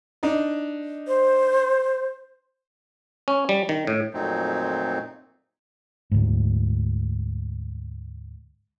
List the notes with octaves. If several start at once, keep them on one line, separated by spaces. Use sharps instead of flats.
D4 D#4 D#5
C5
C#4
G3
D#3
A2
F2 A#2 F#3 A3 C4 D#4
D2 G#2